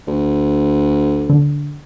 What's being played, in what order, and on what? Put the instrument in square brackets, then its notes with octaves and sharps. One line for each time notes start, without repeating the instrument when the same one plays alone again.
[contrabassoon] D2
[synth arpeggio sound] D3